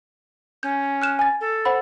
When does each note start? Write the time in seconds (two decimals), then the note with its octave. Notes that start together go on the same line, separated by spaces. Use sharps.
0.63 C#4 G6
1.02 F6 F#6 E7
1.19 G#5 A6
1.41 A4
1.65 C5 F#5 B5